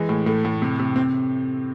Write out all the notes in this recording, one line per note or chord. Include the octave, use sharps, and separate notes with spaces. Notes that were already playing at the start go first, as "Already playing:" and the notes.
Already playing: E3 G#3
A2
A2 A3
A2
C3
C3
C4